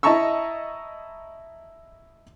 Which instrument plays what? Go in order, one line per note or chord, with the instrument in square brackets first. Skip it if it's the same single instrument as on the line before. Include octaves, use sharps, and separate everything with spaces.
[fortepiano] E4 D#5 A5 A#5 C#6 E6